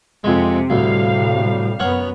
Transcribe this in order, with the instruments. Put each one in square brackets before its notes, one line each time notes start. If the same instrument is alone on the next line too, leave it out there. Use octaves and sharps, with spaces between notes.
[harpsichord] F2 G#3 [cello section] C3
[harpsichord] D2 [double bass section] A2 C3 G3 [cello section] F5
[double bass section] F#2 B3 [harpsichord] A#4 C#5 F#5